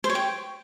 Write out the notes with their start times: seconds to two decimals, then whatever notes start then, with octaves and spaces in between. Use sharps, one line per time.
0.04 C5
0.10 C#5
0.15 G5